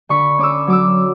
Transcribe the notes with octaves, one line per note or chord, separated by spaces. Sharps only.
D3 B5 C#6
C#4 D6 E6
F#3 D6 E6